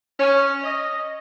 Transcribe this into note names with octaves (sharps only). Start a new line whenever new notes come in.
C#4
D#5